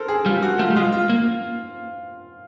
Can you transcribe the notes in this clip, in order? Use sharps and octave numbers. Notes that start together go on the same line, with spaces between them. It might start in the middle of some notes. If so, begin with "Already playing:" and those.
Already playing: A4 A#4 C5
G#4
G3 F4
F#4
A3 F4
G3
G#3 F4
F4
A#3